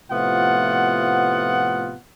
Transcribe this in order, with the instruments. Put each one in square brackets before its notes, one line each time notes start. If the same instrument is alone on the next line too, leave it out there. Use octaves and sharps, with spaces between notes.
[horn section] A2 C3 F3 B3 F4 F#5